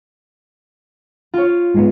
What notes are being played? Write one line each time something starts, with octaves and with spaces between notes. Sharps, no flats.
F4 C#5
G#2 G#3 B3